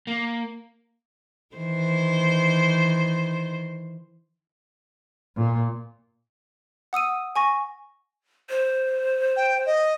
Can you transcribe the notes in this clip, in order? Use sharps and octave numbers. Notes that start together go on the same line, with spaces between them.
A#3
D#3 E3 C5
A#2
F#5 D#6 E6 D#7
G#5 C#6 A#6
C5
G5
D#5